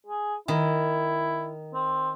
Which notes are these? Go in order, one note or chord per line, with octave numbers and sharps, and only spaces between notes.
G#4
D#3 E4
C4